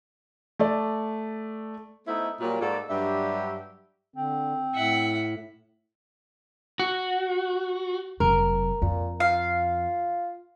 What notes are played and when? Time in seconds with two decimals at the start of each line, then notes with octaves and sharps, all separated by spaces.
0.59 A3 D5
2.07 A3 B3 D#4 E4 C5 E5
2.40 A#2 F#3 G3
2.60 G#2 A#3 F#4 A4 D5
2.90 G2 F#3 D4 G4 E5
4.16 D3 C4
4.75 A2 E5 F#5
6.80 F#4
8.20 F1 F#3 A#4
8.82 F2 A#2
9.20 F4 F5